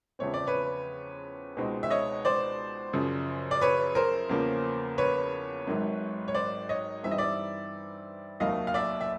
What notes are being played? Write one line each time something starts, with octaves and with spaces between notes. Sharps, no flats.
E2 C#3 F3 A3 C4 C#5
D5
B4 C#5
C#2 B2 G#3 C4 D#4
E5
C#5 D#5
C5 D5
F#2 C#3 F3
D5
B4 C#5
A#4 C5
E2 C#3 F3 A#3 C#4
B4 C#5
G#1 G#2 D#3 F#3 A3
C#5
C5 D5
C#5 D#5
G2 E3 G3 C4 D#4 E5
D#5
D5 E5
F1 D#2 D#3 F#3 A3 D#5 F5
F5
D5 E5
E5